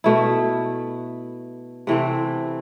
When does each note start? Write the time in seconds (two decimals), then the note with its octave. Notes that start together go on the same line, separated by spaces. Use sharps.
0.04 B2 A3 E4
1.87 C3 E3 A3 C4